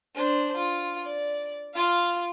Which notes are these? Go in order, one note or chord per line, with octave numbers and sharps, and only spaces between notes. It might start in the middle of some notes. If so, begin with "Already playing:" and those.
D4 C5
F4
D5
F4 F5